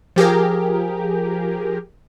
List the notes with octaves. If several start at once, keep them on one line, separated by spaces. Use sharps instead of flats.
F3 G4 G#4 A#4